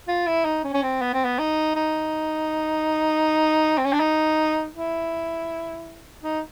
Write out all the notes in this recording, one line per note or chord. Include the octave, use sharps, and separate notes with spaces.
F4
E4
D#4
C#4
C#4
C4
B3
C4
B3
D#4
D#4
C4
C#4
D4
D#4
E4
D#4